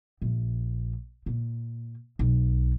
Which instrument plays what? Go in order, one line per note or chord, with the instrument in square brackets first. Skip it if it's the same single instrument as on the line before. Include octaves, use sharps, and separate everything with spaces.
[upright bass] A#1
A#2
B1